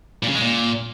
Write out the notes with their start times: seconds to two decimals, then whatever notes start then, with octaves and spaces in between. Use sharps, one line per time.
0.23 A#2
0.29 C#3
0.35 G#3
0.41 A#2